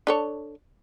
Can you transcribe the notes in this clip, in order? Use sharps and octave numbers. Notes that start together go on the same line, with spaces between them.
D4 A4 C#5